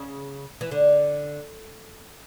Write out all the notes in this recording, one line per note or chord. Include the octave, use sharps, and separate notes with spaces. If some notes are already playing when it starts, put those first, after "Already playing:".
Already playing: C#3
E3
D3